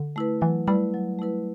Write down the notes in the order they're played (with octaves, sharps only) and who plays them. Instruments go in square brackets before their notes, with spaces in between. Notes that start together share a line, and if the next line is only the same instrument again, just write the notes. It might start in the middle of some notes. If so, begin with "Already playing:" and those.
Already playing: [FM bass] D3
[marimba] A3 E4 B4
[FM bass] E3 [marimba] F#3
[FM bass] G3 [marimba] A3 E4 B4
[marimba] F#3
A3 E4 B4